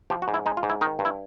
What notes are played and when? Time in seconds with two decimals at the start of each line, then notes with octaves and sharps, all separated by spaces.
0.10 F3 G4
0.22 F#4
0.28 G#2
0.34 E4
0.46 G#3 D#4
0.57 F4
0.63 G#2
0.69 E4
0.81 D#3 D#4
0.99 G2
1.05 E4